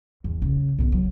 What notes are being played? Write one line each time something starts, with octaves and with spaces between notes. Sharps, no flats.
E2
C#3
B1 D#3
F#3